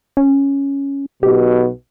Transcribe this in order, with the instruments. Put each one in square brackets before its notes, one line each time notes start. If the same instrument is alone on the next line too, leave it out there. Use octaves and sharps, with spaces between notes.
[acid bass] C#4
[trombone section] B1 B2 [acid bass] G4